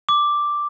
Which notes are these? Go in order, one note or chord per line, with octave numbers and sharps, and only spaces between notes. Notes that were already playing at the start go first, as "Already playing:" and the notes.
D6